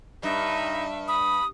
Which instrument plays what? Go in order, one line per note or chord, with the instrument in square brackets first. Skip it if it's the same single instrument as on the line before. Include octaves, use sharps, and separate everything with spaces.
[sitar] G2 [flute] D#4 [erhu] E5
[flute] B5 [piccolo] D#6